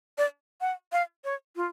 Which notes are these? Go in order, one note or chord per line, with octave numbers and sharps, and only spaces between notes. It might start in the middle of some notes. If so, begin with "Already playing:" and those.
D5
F#5
F5
C#5
F4